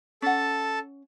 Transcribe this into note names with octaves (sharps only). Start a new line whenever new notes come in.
C#4 A4 F#5 A5